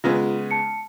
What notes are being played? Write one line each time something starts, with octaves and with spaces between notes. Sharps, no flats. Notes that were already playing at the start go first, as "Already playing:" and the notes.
C#3 G#3 B3 F4
A5 C#7